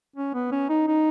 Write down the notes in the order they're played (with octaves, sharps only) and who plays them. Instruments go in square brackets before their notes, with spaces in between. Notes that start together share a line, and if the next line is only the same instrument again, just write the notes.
[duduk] C#4
B3
C#4
D#4
D#4